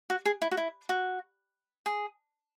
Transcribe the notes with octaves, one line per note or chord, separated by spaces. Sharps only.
F#4
G#4
E4
F#4
E4
F#4
G#4